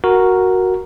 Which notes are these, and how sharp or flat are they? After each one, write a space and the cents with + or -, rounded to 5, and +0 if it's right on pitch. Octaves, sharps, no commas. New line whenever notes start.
F#4 +0 A#4 +0